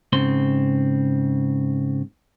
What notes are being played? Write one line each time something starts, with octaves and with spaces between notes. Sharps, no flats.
G#2 C#3 C4 C6